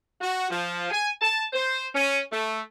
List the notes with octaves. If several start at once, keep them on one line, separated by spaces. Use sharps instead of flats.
F#4
F3
G#5
A5
C5
C#4
A3